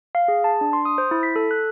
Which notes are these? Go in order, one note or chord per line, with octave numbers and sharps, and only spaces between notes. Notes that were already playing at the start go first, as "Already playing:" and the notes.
F5
G#4
A5
D4
C6
D#6
C5
E4
B6
A4
F#6